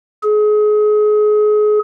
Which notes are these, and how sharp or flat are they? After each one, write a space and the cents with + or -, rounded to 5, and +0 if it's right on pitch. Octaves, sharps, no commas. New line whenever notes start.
G#4 +30